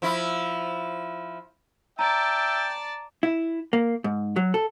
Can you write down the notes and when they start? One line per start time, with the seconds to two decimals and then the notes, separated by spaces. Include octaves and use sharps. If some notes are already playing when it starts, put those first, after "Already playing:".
0.02 F3 E4
1.99 D5 E5 G5 A5 A#5
3.23 E4
3.73 A#3
4.04 G#2
4.36 F#3
4.54 A4